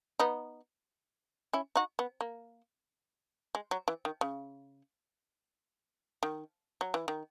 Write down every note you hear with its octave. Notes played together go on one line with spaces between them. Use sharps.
B3 D#4
C#4 E4
D#4 F#4
B3
A#3
G#3
F#3
E3
D#3
C#3
D#3
F#3
E3
D#3